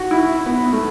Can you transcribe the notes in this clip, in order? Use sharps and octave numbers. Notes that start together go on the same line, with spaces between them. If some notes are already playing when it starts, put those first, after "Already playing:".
Already playing: F#4
E4
B3
A3